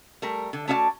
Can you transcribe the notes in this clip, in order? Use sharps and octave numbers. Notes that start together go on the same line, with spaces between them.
G3 A3 A#4
D3
A3 C#4 F#4 D5 E5 A5